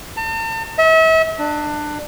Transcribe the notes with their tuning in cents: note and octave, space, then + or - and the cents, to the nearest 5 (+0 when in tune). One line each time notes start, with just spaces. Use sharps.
A5 +40
E5 -40
D4 +20